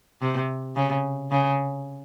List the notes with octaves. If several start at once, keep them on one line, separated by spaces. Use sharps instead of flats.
C3
C#3
C#3